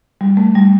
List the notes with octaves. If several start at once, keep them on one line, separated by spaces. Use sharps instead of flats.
G3
A3
G3